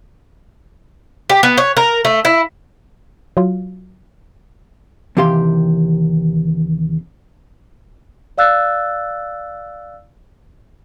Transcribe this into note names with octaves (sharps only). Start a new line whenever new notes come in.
G4
B3
C#5
A#4
A3
E4
F#3 F4
D#2 C3 E3 G4 F5 C6
D5 F5 E6 F#6 A6